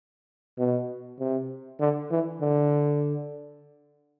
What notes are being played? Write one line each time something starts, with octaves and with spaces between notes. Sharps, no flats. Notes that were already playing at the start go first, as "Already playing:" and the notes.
B2
C3
D3
E3
D3